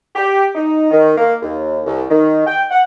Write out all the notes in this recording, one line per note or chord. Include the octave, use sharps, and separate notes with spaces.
G4
D#4
D#3
A#3
D#2
C2
D#3
G5
F#5